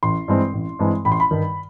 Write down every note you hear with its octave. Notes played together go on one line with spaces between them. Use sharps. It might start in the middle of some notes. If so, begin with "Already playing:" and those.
A1 C6
G2 E3 G#3 C4
A1
G2 E3 G#3 C4
A1 B5
C6
B5
G2 D#3